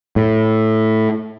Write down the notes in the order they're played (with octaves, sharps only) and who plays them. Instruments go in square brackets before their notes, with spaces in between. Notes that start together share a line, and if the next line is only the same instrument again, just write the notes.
[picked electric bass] A2